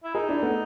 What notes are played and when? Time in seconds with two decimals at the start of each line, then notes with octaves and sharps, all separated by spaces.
0.04 E4
0.14 D#4 G#4 A#4
0.29 D4 E4
0.42 A3 B3